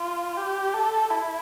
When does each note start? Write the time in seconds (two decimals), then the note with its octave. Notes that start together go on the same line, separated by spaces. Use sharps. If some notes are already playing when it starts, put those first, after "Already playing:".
Already playing: F4
0.37 G4
0.74 A4
1.10 E4